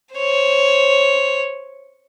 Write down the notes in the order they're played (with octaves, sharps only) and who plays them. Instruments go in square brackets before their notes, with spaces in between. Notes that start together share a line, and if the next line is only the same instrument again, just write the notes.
[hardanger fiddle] C5 C#5